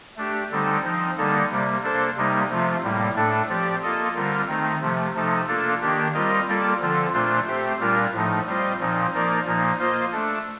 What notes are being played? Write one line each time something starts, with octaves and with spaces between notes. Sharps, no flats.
A3 D4 G4
D3 G3 C4 D#4 A4
F3 C4 D#4
D3 G3 A#3 D#4 A4
C3 G3 A#3
A#3 D4 A4 C5
C3 G3 A#3 D#4
C3 F3 A3 C4 F4
A2 G3 A#3
A2 A3 D4 A4
F3 C4 G4 D5
A#3 F4 A4 D#5
D3 G3 C4 F4 A#4
D#3 A3 C4 D#4
C3 F3 A3
C3 F3 A3 D#4 A4
A#3 D4 F4 A4
D#3 A#3 D4 G4
G3 C4 F4 A#4 D#5
G3 A#3 F4 A4 D5
D3 F3 C4 F4 A4
A#2 A3 D4 F4 C5
A3 C4 G4 C5
A#2 G3 D4 F4 A#4
A2 F3 A3 D#4
G3 C4 F4 C5 D#5
A#2 F3 C4 D#4
F3 A#3 D#4 A#4 D5
A#2 F3 A#3 D#4
A#3 F4 C5 D#5
A3 D4 A4